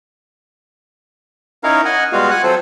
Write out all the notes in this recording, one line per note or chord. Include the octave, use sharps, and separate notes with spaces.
C#4 D#4 E4 A#4 C#5 F5
D#5 F#5 G#5
G3 G#3 B3 F4 F#4 F5
F#5 G#5 F#6
F#3 C4 F4 A4 C5